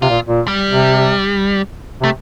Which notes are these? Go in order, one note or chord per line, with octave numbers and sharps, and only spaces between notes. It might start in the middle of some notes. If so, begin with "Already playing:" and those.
C3 F4
A#2
A#2
G3
C3
C3 A3